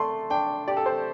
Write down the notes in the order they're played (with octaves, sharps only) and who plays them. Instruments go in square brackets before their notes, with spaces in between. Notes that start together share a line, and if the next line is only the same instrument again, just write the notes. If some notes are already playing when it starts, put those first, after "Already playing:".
Already playing: [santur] A3 [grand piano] D5 C6
[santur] D4 [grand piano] G5
[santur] G4 [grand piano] D5
[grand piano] A4
C5